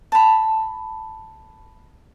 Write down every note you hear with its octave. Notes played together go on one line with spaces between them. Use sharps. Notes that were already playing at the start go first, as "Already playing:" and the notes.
A5 B5